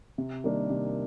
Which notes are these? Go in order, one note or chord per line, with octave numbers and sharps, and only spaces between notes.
C3
D#3 G3 A#3 D4
C3